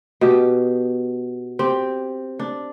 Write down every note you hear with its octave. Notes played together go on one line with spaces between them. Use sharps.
B2 G4
C4 G4
D4